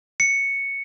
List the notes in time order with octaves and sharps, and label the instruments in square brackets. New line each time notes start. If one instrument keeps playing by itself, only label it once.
[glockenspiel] C#7